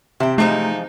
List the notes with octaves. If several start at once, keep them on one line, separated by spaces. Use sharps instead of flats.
C3 E4 G5
E3 F3 G#3 A3 D#4